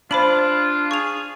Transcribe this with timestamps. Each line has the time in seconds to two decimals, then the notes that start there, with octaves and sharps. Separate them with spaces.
0.11 D4 F4 C5 B5 F#7
0.91 G#4 C#6 F7